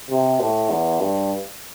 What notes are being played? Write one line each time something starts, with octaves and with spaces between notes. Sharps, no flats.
C3
A2
E2
G2